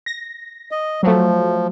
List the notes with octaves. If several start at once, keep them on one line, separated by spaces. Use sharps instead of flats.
A#6
D#5
F3 F#3 A3